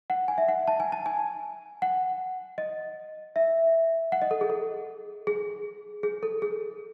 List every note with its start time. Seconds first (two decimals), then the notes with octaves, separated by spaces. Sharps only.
0.10 F#5
0.28 G#5
0.38 E5
0.48 F#5
0.68 A5
0.80 G#5
0.92 A5
1.06 G#5
1.82 F#5
2.58 D#5
3.36 E5
4.12 F#5
4.22 D#5
4.31 A4
4.41 G#4
4.50 A4
5.27 G#4
6.03 G#4
6.23 A4
6.42 G#4